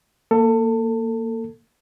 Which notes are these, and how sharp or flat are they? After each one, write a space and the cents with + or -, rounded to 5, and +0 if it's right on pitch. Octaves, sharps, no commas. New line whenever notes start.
A#3 -10 A4 +25